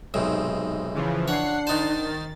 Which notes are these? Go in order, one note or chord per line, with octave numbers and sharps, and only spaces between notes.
B1 G#2 C3
C#3 E3 F3
D4 C#5 F#5 C7
D#3 D#4 C5 A6